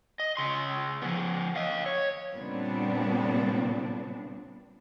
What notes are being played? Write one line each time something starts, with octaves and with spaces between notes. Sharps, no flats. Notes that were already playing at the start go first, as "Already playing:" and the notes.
D#5
C#3 C6
F3 B3
D#5 F5
C#5
A#2 C#3 G3 B3 C4 D4